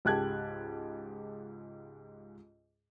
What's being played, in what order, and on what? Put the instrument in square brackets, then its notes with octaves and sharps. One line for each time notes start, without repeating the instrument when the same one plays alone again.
[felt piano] C#2 G#2 G4 A5 F#6 G#6